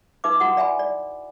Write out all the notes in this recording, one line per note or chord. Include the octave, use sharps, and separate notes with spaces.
D#4 B4 E5 D6
E4 F#4 F#5 D#6
D5 E5 G#5 B5
D5